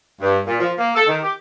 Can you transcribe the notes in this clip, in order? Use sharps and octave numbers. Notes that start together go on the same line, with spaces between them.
G2
A#2
F3
A#3
A4
D#3
G4